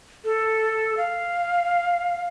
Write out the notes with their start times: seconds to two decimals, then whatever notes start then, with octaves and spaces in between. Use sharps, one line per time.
0.25 A4
0.97 F5